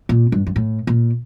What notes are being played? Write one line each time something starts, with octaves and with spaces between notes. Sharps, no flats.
A#2
G2
G2
A2
A#2